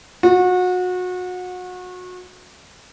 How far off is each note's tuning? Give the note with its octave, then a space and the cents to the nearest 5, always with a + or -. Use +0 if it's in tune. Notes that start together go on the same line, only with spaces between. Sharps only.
F#4 -30